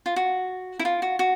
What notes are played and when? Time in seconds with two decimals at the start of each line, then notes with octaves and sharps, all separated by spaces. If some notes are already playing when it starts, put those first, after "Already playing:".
0.06 F4
0.16 F#4
0.79 E4
0.85 F4
1.02 F#4
1.19 F#4